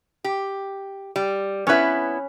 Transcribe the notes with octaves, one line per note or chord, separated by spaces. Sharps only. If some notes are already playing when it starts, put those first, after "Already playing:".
G4
G3
B3 C#4 E4 B4